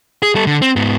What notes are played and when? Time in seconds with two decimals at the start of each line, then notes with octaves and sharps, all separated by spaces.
0.23 G#4
0.35 G3 A4
0.47 D3
0.62 C4
0.76 G#2 B3